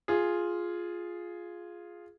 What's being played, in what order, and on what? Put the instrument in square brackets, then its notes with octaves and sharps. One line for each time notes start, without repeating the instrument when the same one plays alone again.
[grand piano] F4 G#4